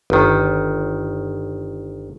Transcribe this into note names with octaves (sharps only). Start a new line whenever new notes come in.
G1 D#3